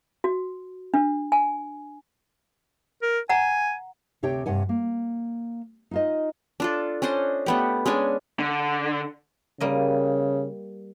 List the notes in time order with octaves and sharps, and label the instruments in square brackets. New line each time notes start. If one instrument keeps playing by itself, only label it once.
[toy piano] F#4
D4
G#5
[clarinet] A#4
[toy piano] F#5 A#5 [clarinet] G#5
[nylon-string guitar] D2 C3 G4 C#5 G5
G2 C3 C#5 F#5 G#5
A#3
D#4 F4 D#5
[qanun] D4 F4 A4
C#4 D4 C5 D#5
A3 B3 G4
G#3 C#4 D4 G#5
[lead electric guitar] D3
[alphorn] C#3 [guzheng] G3 A#3 D#5